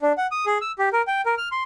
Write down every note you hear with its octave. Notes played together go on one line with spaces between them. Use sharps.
D4
F#5
D#6
G#4
E6
G4
A#4
G5
A#4
F6
C6